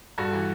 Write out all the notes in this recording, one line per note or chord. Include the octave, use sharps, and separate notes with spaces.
G2 F#4 A4
E3